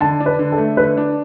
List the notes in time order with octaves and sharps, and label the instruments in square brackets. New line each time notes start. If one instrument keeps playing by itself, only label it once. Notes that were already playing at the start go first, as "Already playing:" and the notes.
[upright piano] D3 [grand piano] A5
[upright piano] D4
[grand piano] B4
[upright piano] D3
[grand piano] A4
[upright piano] A3
[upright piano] D3 [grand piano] B4
[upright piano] D4